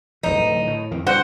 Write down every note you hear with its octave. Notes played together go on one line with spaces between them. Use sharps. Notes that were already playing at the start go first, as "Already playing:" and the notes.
D1 B1 E3 D#4
A2
F2 D#3
G2 B2 D3 C5 F#5